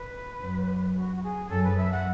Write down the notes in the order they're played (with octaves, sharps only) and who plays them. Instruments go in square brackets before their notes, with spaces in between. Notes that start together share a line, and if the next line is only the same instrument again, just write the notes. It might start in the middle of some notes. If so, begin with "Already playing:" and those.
Already playing: [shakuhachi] B4
[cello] F#2
[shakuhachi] F#4
F#4
G#4
[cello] F#2 [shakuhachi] A4
[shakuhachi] B4
E5
F#5